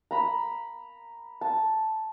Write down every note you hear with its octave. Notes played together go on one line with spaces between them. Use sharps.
A#5 B5
A5